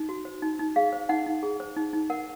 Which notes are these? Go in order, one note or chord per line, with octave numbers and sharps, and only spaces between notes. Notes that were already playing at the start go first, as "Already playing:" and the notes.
Already playing: D#4
F#4
C5
D#4
D#4
G#4 F5
C5
D#4 F#5
D#4
G#4
C5
D#4
D#4
A#4 F#5